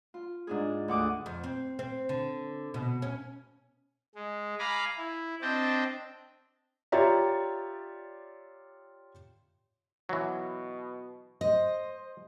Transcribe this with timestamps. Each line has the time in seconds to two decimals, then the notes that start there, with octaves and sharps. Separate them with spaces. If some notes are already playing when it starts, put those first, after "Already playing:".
0.14 F4
0.47 G#2 D4 G#4
0.88 D2 F#5 D6 D#6
1.26 F2
1.44 C4
1.79 C4
2.09 D3
2.74 B2
3.02 C#4
4.15 G#3
4.59 F5 G#5 A#5 B5 D6 F6
4.98 E4
5.42 C4 D4 D#5 G5 A5
6.92 F4 G4 C#5 D5 E5 A#5
10.09 B2 E3 F#3
11.41 C5 D#5